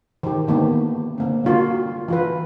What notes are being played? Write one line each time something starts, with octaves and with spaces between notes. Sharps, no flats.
D#3 G4
D3 D#3 A#3 B3
D3 A#3 C4
D3 G3 F4 F#4 A#4
E3 F4 B4